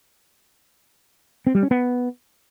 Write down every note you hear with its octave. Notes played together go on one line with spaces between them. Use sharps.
C4
G3
C#4
B3